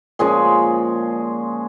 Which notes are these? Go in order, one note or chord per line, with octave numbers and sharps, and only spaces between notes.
A#2 F3 G#3 C#4 G#4